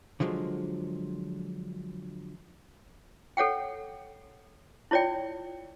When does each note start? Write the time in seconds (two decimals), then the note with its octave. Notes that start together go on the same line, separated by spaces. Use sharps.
0.20 D3 F3 F#3 G#3
3.37 A4 C#5 F#5 G5
4.91 E4 F4 C#5 D5 G5